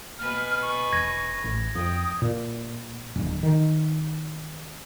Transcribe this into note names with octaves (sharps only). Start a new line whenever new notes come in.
B2 B4 G#5 F6
C#6
E1 G#6 A#6
A1
F2 G5 D#6
A#2
D1
D#3